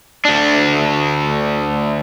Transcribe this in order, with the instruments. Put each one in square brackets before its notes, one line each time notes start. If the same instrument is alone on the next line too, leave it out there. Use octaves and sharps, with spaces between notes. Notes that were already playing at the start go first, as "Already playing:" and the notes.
[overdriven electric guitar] D2 D4